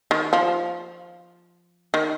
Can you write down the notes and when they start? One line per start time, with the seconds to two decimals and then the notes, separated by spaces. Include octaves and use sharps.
0.11 D#3
0.33 F3
1.94 D#3